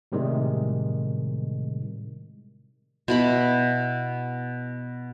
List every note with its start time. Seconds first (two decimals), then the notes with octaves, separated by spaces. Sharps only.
0.12 A2 C3 D#3 G3 G#3
3.08 B2 E4 B5